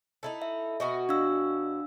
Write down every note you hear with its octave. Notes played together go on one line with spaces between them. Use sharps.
D#4 E4 A4
E5
B2 F#4 D#5
D4 F5 E6